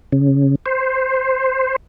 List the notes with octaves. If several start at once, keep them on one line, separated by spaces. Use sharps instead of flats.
C#3
C5